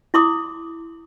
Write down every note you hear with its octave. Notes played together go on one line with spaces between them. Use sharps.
E4 C6 D6 D#6